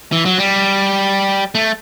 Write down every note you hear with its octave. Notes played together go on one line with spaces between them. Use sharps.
E3
F#3
G3
A3